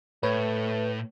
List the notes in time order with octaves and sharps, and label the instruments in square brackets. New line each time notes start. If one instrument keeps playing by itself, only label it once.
[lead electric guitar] A2 [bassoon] A3 [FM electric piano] B4 [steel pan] C#5